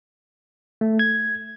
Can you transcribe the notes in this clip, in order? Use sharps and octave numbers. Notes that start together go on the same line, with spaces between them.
A3
G#6